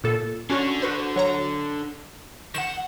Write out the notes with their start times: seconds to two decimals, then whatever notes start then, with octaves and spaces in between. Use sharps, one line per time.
0.04 A#2 A4
0.50 D3 C#4 F#4 C#5
0.82 F#4 B4 C5
1.16 F#3 C#5 A#5
2.55 D#3 F#5 E7